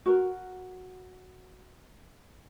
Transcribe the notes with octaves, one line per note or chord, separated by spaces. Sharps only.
F#4 A#4